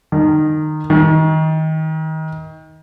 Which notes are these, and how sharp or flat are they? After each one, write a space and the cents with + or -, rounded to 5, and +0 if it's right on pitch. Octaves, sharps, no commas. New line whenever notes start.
D#3 -20
D#3 +25